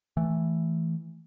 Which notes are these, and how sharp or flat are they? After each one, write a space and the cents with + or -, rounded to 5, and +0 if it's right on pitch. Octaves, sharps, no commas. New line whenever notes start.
E3 +0 A3 +0